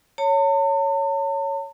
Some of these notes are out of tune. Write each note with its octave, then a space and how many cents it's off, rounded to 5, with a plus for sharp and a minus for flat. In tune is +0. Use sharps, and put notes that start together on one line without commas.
C#5 +5 A5 +45